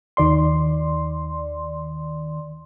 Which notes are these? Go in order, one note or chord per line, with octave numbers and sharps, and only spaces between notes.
D#2 D#3 D5 C6